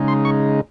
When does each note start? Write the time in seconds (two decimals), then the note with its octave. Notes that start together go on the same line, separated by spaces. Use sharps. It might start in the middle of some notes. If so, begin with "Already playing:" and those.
Already playing: C#3 G#3 D#4
0.08 C6
0.25 C#6